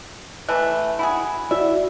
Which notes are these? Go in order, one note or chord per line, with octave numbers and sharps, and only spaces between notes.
E3 A3 F#6
E4 F#4 G#4 B5
E4 F#4 D5 E5